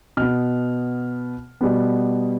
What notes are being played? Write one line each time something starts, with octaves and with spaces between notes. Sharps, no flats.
B2 B3 F6
B2 G3 B3